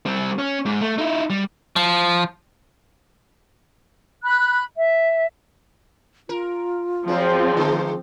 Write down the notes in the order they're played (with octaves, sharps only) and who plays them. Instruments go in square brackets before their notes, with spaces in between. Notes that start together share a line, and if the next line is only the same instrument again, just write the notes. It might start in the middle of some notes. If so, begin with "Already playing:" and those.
[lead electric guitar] G3 C4
C#4
G#2
A3
D#4 E4
G3
[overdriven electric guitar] F3
[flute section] B5 F#6
E5
[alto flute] F4 [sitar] A#4
[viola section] F3 C4 [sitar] F#3 G#3
[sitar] D3 G#3